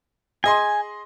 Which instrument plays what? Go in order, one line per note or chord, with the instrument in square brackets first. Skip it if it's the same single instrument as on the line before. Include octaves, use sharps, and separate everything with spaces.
[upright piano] G#4 D#5 C6 [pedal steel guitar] G#5